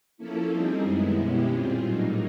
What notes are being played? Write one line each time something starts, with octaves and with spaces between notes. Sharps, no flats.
F3 A#3 C#4 E4 A4
G3 C4 D#4 G#4
F#2 D#3 G#3 B3 E4
B2 G#3 C#4 E4 G4
A#2 G3 C4 F4 G#4
A2 F#3 A#3 D#4